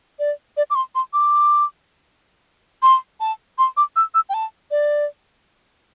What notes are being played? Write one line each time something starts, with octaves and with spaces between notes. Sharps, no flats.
D5
D5
D6
C6
C6
D6
C6
A5
C6
D6
E6
E6
G5
A5
D5